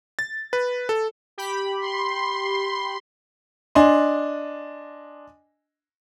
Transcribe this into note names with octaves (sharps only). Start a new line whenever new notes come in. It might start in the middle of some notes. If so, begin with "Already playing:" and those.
A6
B4
A4
G4 B5
C6
D4 D#5 G#5 C6